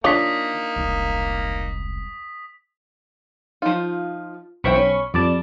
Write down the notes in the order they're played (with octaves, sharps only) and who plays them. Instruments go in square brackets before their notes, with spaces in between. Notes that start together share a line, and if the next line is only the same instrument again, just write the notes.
[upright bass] D3 [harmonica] A#3 D#4 [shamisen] D4 F4 C#5 [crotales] D#6 B6
[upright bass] E1 C2
[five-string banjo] F3 D#4 [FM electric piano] F4
[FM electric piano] B1 B5 C#6 [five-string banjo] E3 C5 G5
[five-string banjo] C#4
[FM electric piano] F2 D5 A5 [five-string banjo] G3